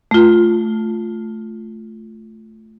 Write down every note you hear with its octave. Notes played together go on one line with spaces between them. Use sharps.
A3 F4